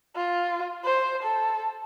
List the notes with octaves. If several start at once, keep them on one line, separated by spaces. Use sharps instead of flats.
F4
C5
A4